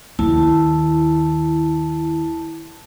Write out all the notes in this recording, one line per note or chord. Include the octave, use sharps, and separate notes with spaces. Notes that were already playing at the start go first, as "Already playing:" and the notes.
D#2 E4 A5